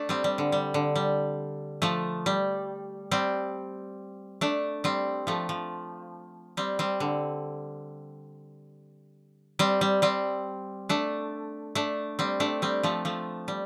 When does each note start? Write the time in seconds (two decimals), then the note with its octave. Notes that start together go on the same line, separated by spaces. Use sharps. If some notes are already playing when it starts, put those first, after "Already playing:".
Already playing: A3 D4
0.09 G3 C4
0.24 G3
0.38 D3
0.52 G3
0.74 D3
0.96 G3
1.82 F3 A3
2.26 G3
3.11 G3 C4
4.41 A3 D4
4.84 G3 C4
5.27 F3 A3
5.49 F3
6.57 G3 C4
6.79 G3 C4
7.00 D3
9.59 G3 C4
9.81 G3
10.02 G3 C4
10.89 A3 D4
11.75 A3 D4
12.19 G3 C4
12.40 A3 D4
12.62 G3 C4
12.83 F3 A3
13.05 F3 A3
13.48 G3